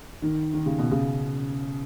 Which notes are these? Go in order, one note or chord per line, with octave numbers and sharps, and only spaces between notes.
D#3
D#3
C#3
B2
C#3